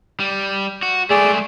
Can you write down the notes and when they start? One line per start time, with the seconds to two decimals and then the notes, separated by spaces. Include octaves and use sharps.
0.20 G3
0.83 F#4
1.10 G#3 A3 G#4 D5